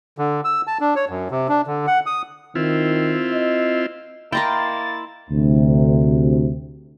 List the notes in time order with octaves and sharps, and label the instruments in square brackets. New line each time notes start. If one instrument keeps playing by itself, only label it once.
[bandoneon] D3
E6
A5
D4
C#5
F#2
C3
D4
D3
F#5
D#6
[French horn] D#3 [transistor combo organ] C4 E4 F4
[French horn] D#5
[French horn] A#3 [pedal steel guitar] E4 B5 C6 [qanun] A#4 D#5 G5 [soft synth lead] A6
[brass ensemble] D2 C3